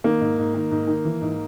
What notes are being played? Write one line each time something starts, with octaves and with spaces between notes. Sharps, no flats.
D#3 A#3
G#2
G#2
D#3
G#2
D#3
E3
G#2